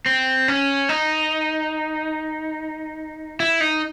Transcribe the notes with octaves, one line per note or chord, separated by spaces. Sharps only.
C4
C#4
D#4
E4
D#4